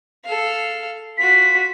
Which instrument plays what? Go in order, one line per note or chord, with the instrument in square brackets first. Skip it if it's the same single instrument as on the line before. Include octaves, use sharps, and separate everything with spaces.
[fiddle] A4 F5
[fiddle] F4 F#4 [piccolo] B6